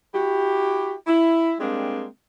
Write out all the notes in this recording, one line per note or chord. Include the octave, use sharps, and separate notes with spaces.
E4 F#4 G4
E4
G3 G#3 A#3 C4 D4